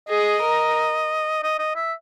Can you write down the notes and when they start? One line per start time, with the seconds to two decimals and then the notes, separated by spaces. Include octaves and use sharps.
0.09 G#4 D#5
0.43 A#4
1.43 D#5
1.59 D#5
1.76 E5